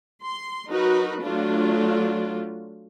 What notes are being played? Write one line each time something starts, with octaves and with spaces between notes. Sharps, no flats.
C6
F#3 D#4 F#4 A#4 B4
F#3 A3 D4 F4